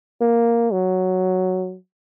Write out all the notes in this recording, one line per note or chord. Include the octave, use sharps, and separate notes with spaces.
A#3
F#3